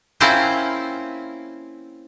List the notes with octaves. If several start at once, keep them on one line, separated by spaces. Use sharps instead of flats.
A#3 C4 C#4 E4 F4 C5